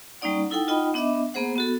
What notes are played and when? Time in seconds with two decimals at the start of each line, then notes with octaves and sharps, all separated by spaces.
0.22 G3 A#3 C#4 D#4 D5 F#5
0.50 D#4 E4 A4 F#5 G5
0.68 D#4 F4 D#5 F#5 G5 B5
0.94 B3 D4 D#5 E5 D6
1.34 A#3 B3 G#4 C5 F#5
1.56 B3 F#4 A4